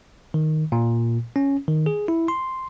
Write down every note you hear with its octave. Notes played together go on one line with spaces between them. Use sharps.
D#3
A#2
C#4
D#3
G#4
E4
C6